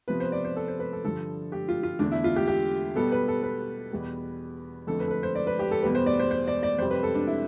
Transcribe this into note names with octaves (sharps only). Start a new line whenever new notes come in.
C3 F3 B3 B4
C5
D5
C5
A4
C5
B4
A4
G2 D3 F3 A4
G4
F4
F4
E2 D3 A3 D4
E4
F4
G4
G4
B2 G3 B3 A4
B4
A4
B4
E2 B2 G3 B3
F2 D3 F3 A3 A4
B4
A4
B4
C5
D5
B4
G4
A4
E2 B2 G3 B3 B4
C5
D5
C5
C5
D5
D5
F2 C3 G3 C5
B4
A4
D4
E4